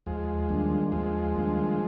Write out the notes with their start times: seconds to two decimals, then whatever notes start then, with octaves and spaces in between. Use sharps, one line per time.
0.06 D#2 F3 G#3
0.49 D#3 G3 A#3 D4
0.92 D#2 F3 G#3
1.35 D#3 G3 A#3 D4